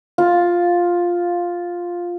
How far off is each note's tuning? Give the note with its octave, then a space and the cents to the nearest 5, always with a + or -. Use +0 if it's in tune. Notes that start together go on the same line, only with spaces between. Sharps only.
F4 +5 F5 +10